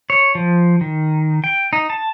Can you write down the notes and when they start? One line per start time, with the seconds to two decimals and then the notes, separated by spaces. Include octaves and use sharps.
0.10 C#5
0.35 F3
0.81 D#3
1.44 G5
1.73 D#4
1.90 A5